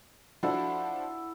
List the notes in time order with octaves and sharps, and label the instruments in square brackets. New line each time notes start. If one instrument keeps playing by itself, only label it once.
[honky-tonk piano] F3 D4 F#4 [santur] E4 A4 D5 [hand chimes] F#5